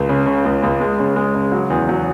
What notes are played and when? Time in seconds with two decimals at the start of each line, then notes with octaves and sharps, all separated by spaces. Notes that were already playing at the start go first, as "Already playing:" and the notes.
Already playing: C#2
0.09 C#3
0.26 C#3
0.45 C#2
0.63 C#2
0.80 G#3
0.99 C#3
1.16 G#3
1.35 C#3
1.52 F#3
1.70 E2
1.89 F#3